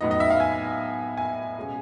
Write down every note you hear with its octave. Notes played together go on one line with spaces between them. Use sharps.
A2 F#3 B3 D#4 D#5
D#5
E5
F5
G#5
G#5
B2 G#3 C#4